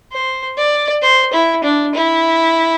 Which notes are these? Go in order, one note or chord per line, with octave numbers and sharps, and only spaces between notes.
C5
D5
C5
E4
D4
E4